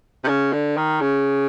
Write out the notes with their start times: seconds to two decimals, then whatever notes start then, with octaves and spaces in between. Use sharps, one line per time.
0.24 C3
0.28 C#3
0.53 D3
0.77 D#3
1.01 C#3